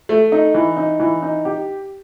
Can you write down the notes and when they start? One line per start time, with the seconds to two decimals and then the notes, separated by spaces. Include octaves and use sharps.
0.09 A3
0.32 D#4
0.54 E3
0.77 D#4
1.00 E3
1.22 D#4
1.45 G4